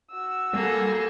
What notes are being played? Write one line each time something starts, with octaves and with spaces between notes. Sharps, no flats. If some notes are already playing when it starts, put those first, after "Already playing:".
F#4 E6
G3 A#3 G#4 A4